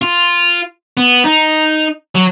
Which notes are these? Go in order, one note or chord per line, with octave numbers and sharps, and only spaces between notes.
F4
B3
D#4
F#3